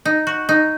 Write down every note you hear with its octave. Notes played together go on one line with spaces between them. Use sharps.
D#4
F#4
D#4